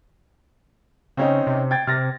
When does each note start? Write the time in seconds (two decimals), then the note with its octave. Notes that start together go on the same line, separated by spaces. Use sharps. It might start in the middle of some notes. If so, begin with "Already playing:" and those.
1.17 C#3 C4 C#4 D#4
1.47 C3
1.71 G5 G#6 A6
1.87 C3 F6 A6 A#6